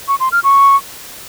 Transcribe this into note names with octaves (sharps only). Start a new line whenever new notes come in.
C#6
C6
F6
C#6